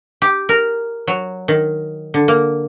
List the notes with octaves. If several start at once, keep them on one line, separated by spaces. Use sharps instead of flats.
G4
A#4
F#3
D#3
D3
A#3